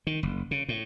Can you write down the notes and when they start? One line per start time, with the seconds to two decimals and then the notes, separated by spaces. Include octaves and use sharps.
0.07 D#3
0.23 F#1
0.51 C#3
0.69 A2